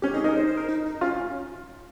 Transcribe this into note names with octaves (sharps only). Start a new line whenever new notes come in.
C#4 G4
D#4 G#4
D#4 A#4
C5
C5
A#4
D#4
D#4
C#4 F4